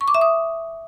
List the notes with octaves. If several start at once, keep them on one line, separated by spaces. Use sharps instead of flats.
C#6
D6
E5
D#6